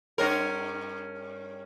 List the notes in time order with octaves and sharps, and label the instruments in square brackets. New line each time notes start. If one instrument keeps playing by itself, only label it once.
[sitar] G2 C#4 A#4